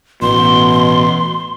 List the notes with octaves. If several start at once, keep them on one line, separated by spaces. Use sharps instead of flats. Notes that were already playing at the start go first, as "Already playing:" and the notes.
A1 B2 C6